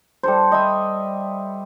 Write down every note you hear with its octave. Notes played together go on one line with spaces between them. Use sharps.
G3 A4 C5
D#5 E5 B5